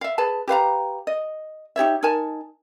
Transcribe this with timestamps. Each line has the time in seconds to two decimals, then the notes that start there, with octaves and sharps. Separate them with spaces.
0.01 E5 F5
0.18 G#4 B4 A5
0.48 G4 B4 F5 A#5
1.07 D#5
1.76 D#4 G4 C#5 E5
2.03 D#4 A#4 G#5 A5